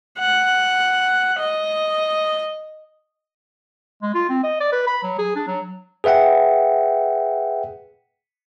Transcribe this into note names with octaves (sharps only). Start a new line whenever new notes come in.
F#5
D#5
G#3
F4
C4
D#5
D5
B4
B5
F#3
G#4
D4
F#3
G#4 B4 E5 F#5 G5